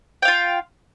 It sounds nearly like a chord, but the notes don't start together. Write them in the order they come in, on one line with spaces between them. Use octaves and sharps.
G5 F5 F4